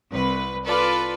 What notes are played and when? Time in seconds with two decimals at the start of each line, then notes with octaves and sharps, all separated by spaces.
0.11 C2 B4
0.65 F4 A4 B4 D5